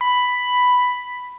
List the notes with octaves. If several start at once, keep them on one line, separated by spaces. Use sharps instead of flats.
B5